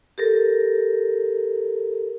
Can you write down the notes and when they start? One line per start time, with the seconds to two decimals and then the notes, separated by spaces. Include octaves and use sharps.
0.18 G4 A4 A#4